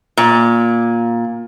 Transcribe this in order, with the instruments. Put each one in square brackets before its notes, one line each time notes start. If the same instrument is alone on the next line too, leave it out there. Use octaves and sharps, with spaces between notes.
[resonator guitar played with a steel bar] A#2